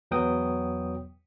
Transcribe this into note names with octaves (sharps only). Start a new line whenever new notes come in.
E2 F#3 B3 G5 D#6